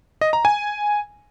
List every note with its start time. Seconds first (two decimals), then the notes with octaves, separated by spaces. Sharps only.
0.21 D#5
0.33 A#5
0.45 G#5